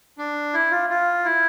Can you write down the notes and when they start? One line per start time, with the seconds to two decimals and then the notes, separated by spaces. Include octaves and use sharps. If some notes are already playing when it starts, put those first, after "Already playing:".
0.18 D4
0.54 E4
0.71 F4
0.90 F4
1.25 E4